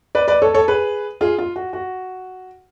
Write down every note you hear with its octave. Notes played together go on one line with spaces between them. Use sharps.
B4 D5
B4 D5
A4 C#5
A4 C#5
G#4 B4
F4 G#4
F4
F#4
F#4